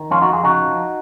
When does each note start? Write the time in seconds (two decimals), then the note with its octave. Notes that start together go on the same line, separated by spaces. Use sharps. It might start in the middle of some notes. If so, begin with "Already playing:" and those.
Already playing: D#3
0.10 F2 C#4 F4
0.21 D#4 F#4
0.28 F2
0.33 F4 G#4
0.44 C#3 D#4 F#4
0.61 F3